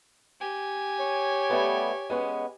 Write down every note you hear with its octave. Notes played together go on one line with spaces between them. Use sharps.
G4 G#5
C#5
G3 A3 B3
G#3 B3 C#4